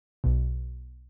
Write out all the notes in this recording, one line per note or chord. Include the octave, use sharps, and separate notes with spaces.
B1 B2